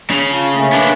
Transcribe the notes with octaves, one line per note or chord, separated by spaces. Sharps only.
C#3
F4 A5
A3 A#3 C#4
B3 D4